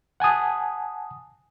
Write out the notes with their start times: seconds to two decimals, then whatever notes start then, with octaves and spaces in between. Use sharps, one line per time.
0.20 F#5 G#5 A5 D#6